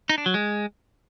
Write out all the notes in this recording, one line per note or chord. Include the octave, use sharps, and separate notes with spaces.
D#4
D4
F#3
G#3